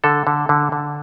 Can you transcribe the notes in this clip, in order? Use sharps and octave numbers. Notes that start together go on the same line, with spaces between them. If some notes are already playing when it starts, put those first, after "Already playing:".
D3 A4
D3
D3
D3